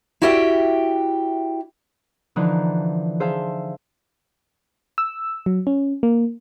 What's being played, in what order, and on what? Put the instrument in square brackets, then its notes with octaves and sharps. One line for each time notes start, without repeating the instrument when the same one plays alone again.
[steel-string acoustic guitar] E4 F#4 G4 D5 E5 G5
[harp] D3 E3 F3 D4 D#4
G#4 C5 E5 F5 A5
[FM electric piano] E6
F#3
C#4
A#3